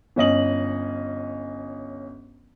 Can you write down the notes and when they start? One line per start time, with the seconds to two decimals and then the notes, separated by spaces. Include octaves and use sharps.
0.16 G1 C#4 D#5 F#7